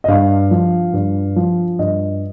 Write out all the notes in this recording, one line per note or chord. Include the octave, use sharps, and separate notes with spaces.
D#5
G2 F5
F3
G2
F3
G2 D#5